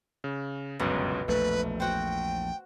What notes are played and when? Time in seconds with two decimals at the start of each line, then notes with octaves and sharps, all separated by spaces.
0.24 C#3
0.80 G1 C#2 F#2 B2
1.28 A#1 E2 A3 B4
1.80 F#4 C5 G5